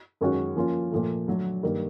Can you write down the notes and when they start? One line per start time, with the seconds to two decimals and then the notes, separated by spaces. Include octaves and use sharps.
0.21 F#2 D#3 G#3 C#4 F#4
0.56 F3 A#3 C#4 F4
0.92 A#2 F3 A3
1.28 D3 F#3 A3
1.63 G2 D#3 G3 A#3